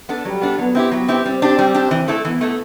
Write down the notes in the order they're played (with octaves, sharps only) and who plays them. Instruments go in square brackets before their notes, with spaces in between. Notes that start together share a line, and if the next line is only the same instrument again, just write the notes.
[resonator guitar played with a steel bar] B3 D4 A4
[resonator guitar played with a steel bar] F#3 [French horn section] G3
[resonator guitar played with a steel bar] B3 D4 A4
[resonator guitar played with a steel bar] F#3 [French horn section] B3
[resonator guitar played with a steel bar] C4 E4 G4
F#3
C4 E4 G4
[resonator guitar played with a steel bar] G3 [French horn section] C4
[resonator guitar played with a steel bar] D4 G4
G3
D4 G4
E3
A3 E4 A4
[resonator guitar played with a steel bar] E3 [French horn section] B3
[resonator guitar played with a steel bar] A3 E4 A4